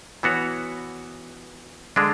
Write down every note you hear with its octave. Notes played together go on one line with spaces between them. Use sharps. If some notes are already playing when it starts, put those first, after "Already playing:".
E3 B3 F#4 C#5
D3 G#3 D4